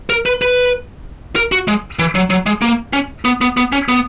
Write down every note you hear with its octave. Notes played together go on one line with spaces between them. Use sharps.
A#4
B4
B4
A#4
F#4
G#3
E3
F#3
F#3
G#3
A#3
C#4
B3
B3
B3
C#4
B3